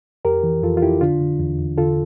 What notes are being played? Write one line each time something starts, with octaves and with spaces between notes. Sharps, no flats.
F2 G4 A#4
E3
F2 F4 A4
F4
F2 E4 G4
D3 D4 F4
D3
E2
E2
D3 F4 A4